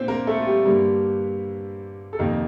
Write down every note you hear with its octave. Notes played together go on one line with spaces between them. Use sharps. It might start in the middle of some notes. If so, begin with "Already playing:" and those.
Already playing: A#2 C4 D4 C5
A#3 A#4
A3 A4
F4
G3 G4
G2 D3 G3 A#3
A4
F2 C3 D#3 A#3 A#4